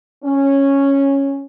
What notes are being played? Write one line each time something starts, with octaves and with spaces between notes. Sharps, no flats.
C#4